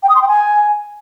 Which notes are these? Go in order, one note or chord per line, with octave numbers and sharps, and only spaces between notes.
G5
D#6
C6
G5
G#5